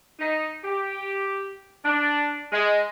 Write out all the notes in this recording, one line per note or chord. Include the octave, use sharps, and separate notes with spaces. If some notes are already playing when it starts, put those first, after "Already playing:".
D#4
G4
D4
G#3